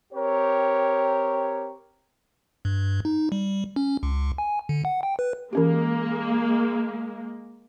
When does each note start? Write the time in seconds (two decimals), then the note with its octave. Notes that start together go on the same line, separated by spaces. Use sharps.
0.13 C4 G4 A#4 C#5
2.65 G2
3.05 D#4
3.32 G3
3.76 C#4
4.03 C#2
4.38 G#5
4.69 D3
4.85 F#5
5.03 G5
5.19 B4
5.53 E3 G#3 A#3 C#4 G4